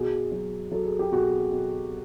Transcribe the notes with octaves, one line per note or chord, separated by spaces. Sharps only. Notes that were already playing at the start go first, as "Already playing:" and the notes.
Already playing: B2 F#4 G#4
F#3
F#3 A4
G#4
G4
B2 F#4 G#4
B2